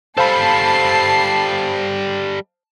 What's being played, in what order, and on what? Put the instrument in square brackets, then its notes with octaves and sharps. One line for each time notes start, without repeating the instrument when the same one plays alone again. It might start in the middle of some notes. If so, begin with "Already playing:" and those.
[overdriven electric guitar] G3 A4 [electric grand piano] C5 F5 B5 [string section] A5 C7